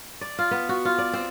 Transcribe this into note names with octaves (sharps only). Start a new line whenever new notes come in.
D5
F4
B3
F#4
F4
D5
C4